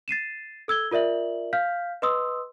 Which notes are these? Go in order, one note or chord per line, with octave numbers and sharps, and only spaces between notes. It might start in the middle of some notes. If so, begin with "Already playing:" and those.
A6 C7 D#7 E7
A4 E6 G#6 G7
F4 A#4 D5 E5 F#7
F5 F6 G6 B6
B4 D#5 C6 D#6 E6